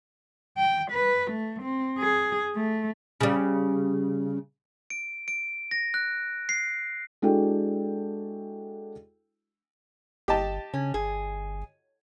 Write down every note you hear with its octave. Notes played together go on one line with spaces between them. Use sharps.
G5
B4
A3
C4
G#4
A3
C#3 G3
D7
D7
A#6
F#6
C7
G#3 D4 E4 F#4 A4 G5
G1 G4 D#5 A5
C#3 C#4
G1 G#4